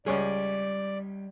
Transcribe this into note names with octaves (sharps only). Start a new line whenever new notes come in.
C#2 G3 C#4 G#4 D5